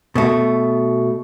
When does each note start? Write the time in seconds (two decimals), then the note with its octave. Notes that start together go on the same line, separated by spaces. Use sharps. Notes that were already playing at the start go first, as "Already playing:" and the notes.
0.15 B2 A3